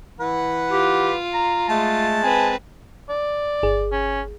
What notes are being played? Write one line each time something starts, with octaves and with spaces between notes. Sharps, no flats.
E3 B4 F#5
F4 G4
A#5
G#3 A3 A5
C4 B4 G#5
D5
G1 G#4
C#4